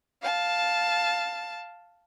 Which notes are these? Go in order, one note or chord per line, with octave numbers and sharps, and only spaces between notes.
F5 A5